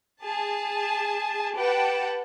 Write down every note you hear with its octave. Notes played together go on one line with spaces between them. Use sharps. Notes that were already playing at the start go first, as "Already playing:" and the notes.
G#4 A5
G4 B4 F#5 G5 A5